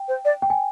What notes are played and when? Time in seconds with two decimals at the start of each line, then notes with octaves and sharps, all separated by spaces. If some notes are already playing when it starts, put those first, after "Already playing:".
Already playing: G5
0.08 C5
0.25 D5
0.42 G5
0.50 G#5